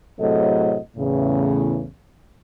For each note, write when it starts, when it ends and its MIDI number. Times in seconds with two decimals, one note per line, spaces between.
0.20 0.77 45
0.20 0.77 48
0.20 0.77 54
0.20 0.77 68
0.20 0.77 69
0.20 0.77 75
0.97 1.85 40
0.97 1.85 45
0.97 1.85 49